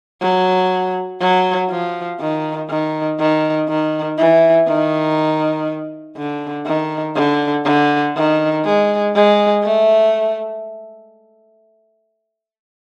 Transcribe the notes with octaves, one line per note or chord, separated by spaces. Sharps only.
F#3
F#3
F3
D#3
D#3
D#3
D#3
E3
D#3
D3
D#3
D3
D3
D#3
G#3
G#3
A3